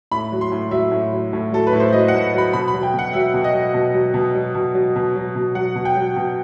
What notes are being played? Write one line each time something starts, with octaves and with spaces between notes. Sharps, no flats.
A2 B5
F#3
C6
A2
F#3 E5
A2
F#3
A2
F#3 A4
B4
A2
C5
F#3 D#5
F#5
A2
F#3 B5
B2 B5
B5
F#3
G5
B2 F#5
F#3 E5
B2
D#5
F#3
B2
F#3
B2
F#3
B2
F#3
B2
F#3
B2
F#3 F#5
B2
G5
F#3
B2